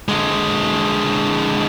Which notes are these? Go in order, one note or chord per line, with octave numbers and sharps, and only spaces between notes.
D3 G#3